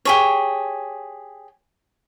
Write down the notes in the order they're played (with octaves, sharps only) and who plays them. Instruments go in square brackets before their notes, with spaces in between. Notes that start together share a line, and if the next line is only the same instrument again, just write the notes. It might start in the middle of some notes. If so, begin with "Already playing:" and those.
[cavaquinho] G4 G#4 C#5